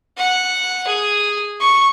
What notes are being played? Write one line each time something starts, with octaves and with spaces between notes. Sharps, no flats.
F#5
G#4
C#6